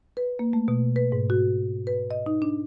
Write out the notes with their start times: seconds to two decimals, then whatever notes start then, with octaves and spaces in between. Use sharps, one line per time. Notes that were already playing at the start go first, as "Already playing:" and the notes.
0.17 B4
0.39 A#3
0.53 A3
0.68 B2
0.96 B4
1.12 G#2
1.30 F#4
1.87 B4
2.11 D#5
2.26 D#4
2.42 D4